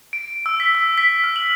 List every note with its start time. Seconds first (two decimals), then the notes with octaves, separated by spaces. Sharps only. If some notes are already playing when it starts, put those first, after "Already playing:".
0.13 D7
0.46 E6
0.60 B6
0.75 E6
0.98 B6
1.24 F6
1.36 F#7